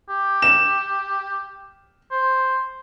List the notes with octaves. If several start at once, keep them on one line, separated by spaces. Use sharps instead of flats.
G4
E7
C5